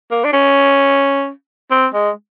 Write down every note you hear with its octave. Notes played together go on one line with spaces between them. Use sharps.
A#3
D4
C#4
C4
G#3